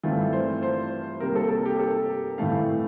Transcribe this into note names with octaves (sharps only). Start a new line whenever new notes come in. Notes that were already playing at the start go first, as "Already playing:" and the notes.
G2 E3 A3 C4 F4
C5
C5
C3 G3 A#3 A#4
A4
A4
G4
A4
A2 E3 A3 C4 F5